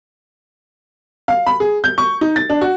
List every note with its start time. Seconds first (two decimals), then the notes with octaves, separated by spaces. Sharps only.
1.28 F5
1.46 B5
1.60 G#4
1.84 G6
1.98 C#6
2.21 D#4
2.36 A6
2.50 D4
2.61 F#4